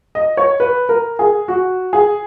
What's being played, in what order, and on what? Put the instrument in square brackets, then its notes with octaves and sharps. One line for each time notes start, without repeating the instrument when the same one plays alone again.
[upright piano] D#5
C#5
B4
A#4
G#4
F#4
G#4